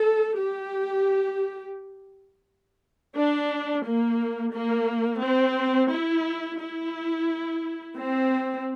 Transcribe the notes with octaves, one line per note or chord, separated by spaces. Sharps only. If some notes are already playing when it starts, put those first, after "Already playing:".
Already playing: A4
G4
D4
A#3
A#3
C4
E4
E4
C4